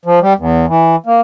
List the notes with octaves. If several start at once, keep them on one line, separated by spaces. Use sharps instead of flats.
F3
G3
E2
E3
A#3